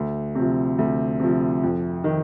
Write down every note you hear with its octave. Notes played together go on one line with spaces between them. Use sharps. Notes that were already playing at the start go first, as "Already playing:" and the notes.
Already playing: D2
C3 F3
D2
C3 F3
F2
D#3